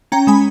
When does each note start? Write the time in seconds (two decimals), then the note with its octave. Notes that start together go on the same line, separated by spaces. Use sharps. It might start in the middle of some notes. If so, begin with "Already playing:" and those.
0.12 C#4 G5 A#5
0.27 G#3 G#5 B5